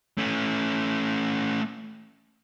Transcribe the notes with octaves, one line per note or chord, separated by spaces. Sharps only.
A3 C#4